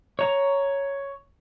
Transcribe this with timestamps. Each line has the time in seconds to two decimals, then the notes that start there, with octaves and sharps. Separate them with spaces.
0.19 C#5 A#5